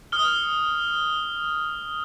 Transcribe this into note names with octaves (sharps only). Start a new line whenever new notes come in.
D#6 F6 G7